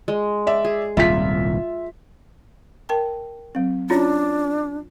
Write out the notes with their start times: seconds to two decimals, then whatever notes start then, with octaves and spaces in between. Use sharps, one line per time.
0.08 G#3
0.47 D5 E5
0.65 G#4
0.97 D#1 C2 G#2 F4 E5 B6
2.89 A#4 G5 A5
3.55 F#3 C4
3.90 C#4 D4 E4 F4 C#5